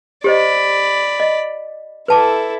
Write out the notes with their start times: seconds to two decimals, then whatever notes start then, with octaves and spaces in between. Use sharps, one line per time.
0.24 G4 C5 D5 D#5 B5
1.20 D#5
2.08 E4 A4 B4 A5 D6